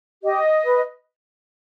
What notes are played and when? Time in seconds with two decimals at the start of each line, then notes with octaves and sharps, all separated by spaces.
0.22 G4 D#5
0.65 B4